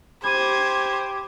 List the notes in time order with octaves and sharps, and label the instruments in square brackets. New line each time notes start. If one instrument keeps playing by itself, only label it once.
[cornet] G4 [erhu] C5 [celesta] B5 D6 D#7 [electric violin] G#6